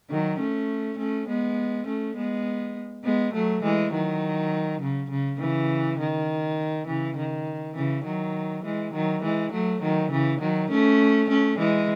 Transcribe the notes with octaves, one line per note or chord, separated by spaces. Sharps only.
D#3 F#3
A3 C#4
A3 C#4
G#3 B3
A3 C#4
G#3 B3
G#3 B3
F#3 A3
E3 G#3
D#3 F#3
C#3
C#3
C#3 E3
D#3
C#3 E3
D#3
C#3 E3
D#3 F#3
E3 G#3
D#3 F#3
E3 G#3
F#3 A3
D#3 F#3
C#3 E3
D#3 F#3
A3 C#4
A3 C#4
E3 G#3